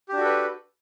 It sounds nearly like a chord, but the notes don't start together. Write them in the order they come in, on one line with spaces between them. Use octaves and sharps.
G4 D4 F#4 A4 B4